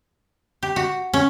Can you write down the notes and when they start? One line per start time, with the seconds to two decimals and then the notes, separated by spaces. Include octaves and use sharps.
0.63 G4
0.76 F#4
1.14 C#4